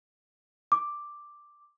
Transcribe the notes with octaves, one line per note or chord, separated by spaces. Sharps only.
D6